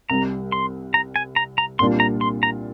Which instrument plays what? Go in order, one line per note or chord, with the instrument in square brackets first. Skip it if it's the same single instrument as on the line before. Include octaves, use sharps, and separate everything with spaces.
[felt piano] C2 C3 G3 [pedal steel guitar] A#5
[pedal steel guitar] C6
A#5
G#5
A#5
A#5
[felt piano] C2 A#2 G3 D4 F4 [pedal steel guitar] C6
[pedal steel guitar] A#5
C6
A#5